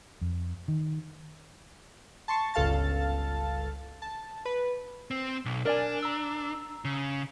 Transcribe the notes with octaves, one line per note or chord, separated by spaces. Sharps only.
F2
D#3
A5 C6 C#6
G1 C#2 A4 F5 A5 A6
A5
B4
C4
B1
D4 A#4 D5 G#5
A#5 E6
C#3